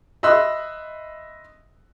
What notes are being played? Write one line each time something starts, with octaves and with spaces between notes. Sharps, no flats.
D#5 E5 B5 C6 E6 F#6